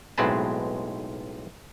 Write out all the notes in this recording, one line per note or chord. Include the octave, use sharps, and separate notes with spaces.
B1 A2 G#3 C4 B4 A5